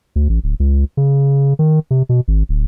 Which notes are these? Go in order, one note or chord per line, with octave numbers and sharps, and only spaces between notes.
D2
A1
D1
C#2
C#3
D#3
C3
B2
G#1
D1